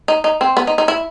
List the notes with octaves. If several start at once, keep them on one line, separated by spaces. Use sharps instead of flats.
D#4
D#4
C4
B3
D#4
D#4
E4